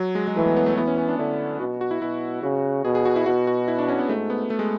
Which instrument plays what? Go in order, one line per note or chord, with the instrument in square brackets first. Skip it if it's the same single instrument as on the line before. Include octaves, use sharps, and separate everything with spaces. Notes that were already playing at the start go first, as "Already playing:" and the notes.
Already playing: [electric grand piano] F#3
G#3
G#3
[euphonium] E3 [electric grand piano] A3
[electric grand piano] B3
B3
A3
[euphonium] E3 [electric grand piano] B3
[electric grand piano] C#4
C#4
D4
[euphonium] D3 [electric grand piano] E4
[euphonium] B2 [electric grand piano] F#4
[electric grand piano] F#4
E4
[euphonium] B2 [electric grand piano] E4
[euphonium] C#3 [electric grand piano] F#4
[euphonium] B2 [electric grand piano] G#4
[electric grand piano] G#4
F#4
E4
[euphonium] B2 [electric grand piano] F#4
[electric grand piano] F#4
E4
D4
C#4
B3
[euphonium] G#2 [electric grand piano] A3
[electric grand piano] B3
A3
G#3